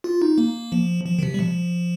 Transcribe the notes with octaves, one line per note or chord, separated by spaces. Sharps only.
F4
D#4
A#3
F3
F3
D#3
C3
G3
F3